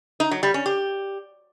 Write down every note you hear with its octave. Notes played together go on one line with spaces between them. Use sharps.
D#4
F#3
G3
C#4
G4